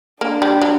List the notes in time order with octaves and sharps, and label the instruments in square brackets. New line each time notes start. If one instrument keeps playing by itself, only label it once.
[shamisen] A#3 [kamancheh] D4
[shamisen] G3
F#3